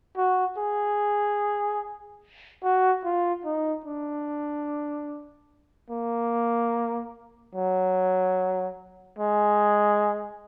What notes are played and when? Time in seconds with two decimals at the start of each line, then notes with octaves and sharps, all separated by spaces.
0.17 F#4
0.58 G#4
2.64 F#4
3.04 F4
3.45 D#4
3.86 D4
5.91 A#3
7.55 F#3
9.19 G#3